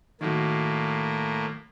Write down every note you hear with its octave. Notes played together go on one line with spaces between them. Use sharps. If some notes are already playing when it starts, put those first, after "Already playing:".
A2 D#3 F#3 A#3